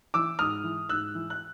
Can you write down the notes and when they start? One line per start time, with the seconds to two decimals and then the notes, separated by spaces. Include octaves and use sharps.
0.14 E3 D6 E6
0.39 G#2 D#6 F6
0.64 E3
0.89 G#2 E6 F#6
1.15 E3
1.30 F#6